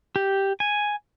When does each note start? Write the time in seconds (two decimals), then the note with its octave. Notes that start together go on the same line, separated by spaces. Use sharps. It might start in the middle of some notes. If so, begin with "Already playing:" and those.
0.16 G4
0.60 G#5